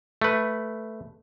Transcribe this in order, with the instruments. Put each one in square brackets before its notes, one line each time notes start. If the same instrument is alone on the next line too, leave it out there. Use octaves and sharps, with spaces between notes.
[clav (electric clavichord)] A3 B4